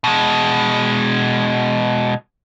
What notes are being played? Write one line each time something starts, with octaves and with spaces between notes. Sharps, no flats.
B2 G#3